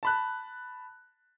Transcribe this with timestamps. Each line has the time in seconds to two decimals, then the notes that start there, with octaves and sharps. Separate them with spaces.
0.03 A5 B5 F#6